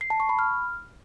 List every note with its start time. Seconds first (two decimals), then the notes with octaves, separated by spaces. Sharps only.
0.01 C7
0.10 A5
0.20 C#6
0.29 B5
0.39 F6